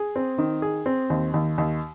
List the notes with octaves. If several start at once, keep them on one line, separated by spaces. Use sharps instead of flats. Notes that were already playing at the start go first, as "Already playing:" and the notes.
Already playing: G#4
C4
D#3
G#4
C4
D#2
D#2
D#2